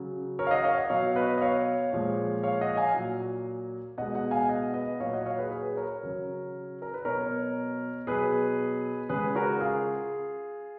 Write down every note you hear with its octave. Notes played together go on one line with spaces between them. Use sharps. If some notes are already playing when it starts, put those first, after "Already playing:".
Already playing: C#3 F#3
A#4 C#5
F5
D#5 F#5
C#5 F5
D#5 F#5
B2 F#3 C#5 F5
B4 D#5
D#5
C#5 F5
A#2 F3 G#3
C#5 F5
D#5 F#5
F5 G#5
A#2 F#3
B2 G#3 D#5 F#5
D#5 F#5
F5 G#5
D#5 F#5
B4 D#5
A#2 F#3 C#5 F5
D#5 F#5
C#5 F5
G#4 B4
G#4 B4
A#4 C#5
C#3 F#3
A#4
B4
B2 F#3 A#4 C#5
B2 F#3 G#4 B4
C#3 G#3 G#4 B4
F#4 A#4
F4 G#4